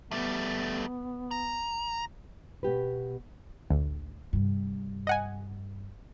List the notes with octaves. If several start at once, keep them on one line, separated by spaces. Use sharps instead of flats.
G3 A3 B3
A#5
B2 B3 G4 B4
A1 D2
G2 C3
D#5 F#5 G#5